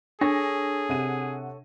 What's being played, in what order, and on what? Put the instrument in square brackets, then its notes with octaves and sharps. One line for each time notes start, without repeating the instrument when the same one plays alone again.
[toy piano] D4 [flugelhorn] G#4 [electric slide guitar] A4 C#5 [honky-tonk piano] A#6
[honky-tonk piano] C3 F#5 D#7